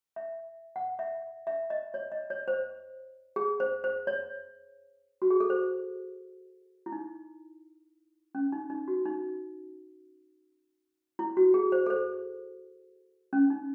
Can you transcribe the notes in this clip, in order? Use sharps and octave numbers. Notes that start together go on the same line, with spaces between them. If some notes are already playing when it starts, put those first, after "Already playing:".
E5
F#5
E5
E5
D#5
C#5
D#5
C#5
C5
G#4
C5
C5
C#5
F#4
G#4
A4
C5
E4
D#4
C#4
D#4
D#4
F#4
D#4
E4
F#4
G#4
C5
A4
C5
C#4
D#4